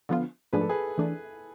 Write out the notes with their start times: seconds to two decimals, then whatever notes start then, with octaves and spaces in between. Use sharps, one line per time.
0.09 D3 F3 B3 F4
0.53 G#2 F3 A3 D4 G#4 B4
0.61 A4
0.69 G#4 B4
0.98 E3 A3 D4